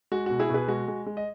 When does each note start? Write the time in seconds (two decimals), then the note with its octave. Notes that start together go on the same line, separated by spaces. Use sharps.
0.12 G#3 F#4
0.26 B2 F#4
0.39 E4 G#4
0.49 B2 G#4 B4
0.68 G#3 F#4
0.88 G#3
1.06 G#3
1.17 D#5